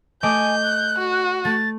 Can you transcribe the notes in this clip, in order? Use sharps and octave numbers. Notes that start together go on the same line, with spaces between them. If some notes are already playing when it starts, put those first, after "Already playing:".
A3 D#5 G#5 D6 G6
F#6
F#4
A3 A6